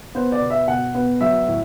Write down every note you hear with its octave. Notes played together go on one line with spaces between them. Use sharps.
B3 C5
D5
B2
E5
B2 F#5
B3
F#3 E5
A2